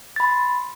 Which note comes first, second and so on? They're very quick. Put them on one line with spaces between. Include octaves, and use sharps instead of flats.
A6 B5 C6